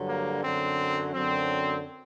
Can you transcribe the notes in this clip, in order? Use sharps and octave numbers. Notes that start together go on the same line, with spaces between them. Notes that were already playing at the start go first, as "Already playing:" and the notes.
Already playing: G2 D3 F#3
A#3
F#2 D3 F#3 C4
F#2 D3 F#3 C4